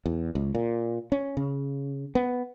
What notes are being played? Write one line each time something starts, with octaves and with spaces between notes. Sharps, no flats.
E2
C#2
A#2
C#4
C#3
B3